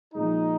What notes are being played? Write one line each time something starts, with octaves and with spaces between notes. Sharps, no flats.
A#2 F3 G#3 D#4